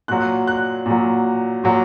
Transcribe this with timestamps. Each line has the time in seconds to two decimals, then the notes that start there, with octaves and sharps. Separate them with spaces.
0.08 A#2 F#3 F#6
0.47 F#6
0.86 A#2 F#3
1.64 A#2 F#3